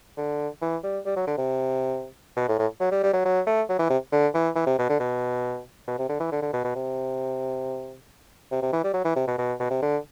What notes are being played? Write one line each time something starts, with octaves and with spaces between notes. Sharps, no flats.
D3
E3
G3
G3
F#3
D3
C3
B2
A2
A2
F#3
G3
G3
F#3
F#3
A3
F#3
E3
C3
D3
E3
E3
C3
B2
D3
B2
B2
C3
D3
E3
D3
D3
B2
B2
C3
C3
C3
E3
G3
F#3
E3
C3
B2
B2
B2
C3
D3